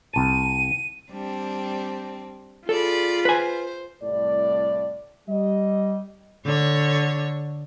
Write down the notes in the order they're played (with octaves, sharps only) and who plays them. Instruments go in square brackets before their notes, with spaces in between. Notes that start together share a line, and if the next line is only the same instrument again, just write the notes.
[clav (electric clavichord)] C2 A5 [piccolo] D#7
[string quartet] G3 C4 D4
[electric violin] F4 [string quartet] G#4 D5 B5 [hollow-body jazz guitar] A4
[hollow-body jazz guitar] B4 G#5 [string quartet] C5
[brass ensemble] C2 A2 D5
G3 D#5
[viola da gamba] D3 C#5